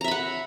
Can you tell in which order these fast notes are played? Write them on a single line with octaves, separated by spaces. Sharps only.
A#5 E5 B5 F#5